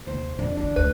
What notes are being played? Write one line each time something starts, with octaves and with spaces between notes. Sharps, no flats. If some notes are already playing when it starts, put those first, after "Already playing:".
D#2 C3 C5
F2 D4
D#3 C#4 D4
D2 B4